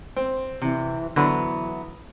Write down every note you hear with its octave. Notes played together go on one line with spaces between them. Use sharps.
C4
C3 E3
D3 E3 F#3 B3 B4